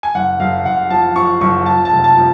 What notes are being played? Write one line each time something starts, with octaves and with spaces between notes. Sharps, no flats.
G#5
F#1 F#5
F#1 F5
F#1 F#5
F3 A5
F3 C#6
F#1 C#6
F3 A5
A5
F1
A5
F3